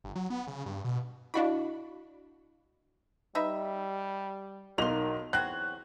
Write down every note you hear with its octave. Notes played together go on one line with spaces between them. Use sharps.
G1
F#3
B3
C#3
G2
B2
D4 E4 F#4 D#5 F5 B5
G3 D#4 B4 E5
B1 A#3 D#4 A#4 C6 F7
E2 F#3 C4 F#4 F#6